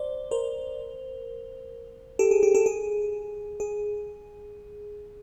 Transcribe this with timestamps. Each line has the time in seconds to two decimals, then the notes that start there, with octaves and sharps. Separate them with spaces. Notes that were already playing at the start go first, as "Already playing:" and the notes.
Already playing: C5 D5
0.31 A#4 C5
2.19 G4 A4
2.31 G#4
2.43 G4
2.54 G4 A4
2.66 G#4
3.60 G#4